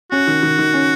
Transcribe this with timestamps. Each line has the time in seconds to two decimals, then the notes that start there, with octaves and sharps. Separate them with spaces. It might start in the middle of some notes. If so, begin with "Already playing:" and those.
0.11 C#4 F#4
0.28 D#3
0.43 D#3
0.59 D#3
0.74 C#4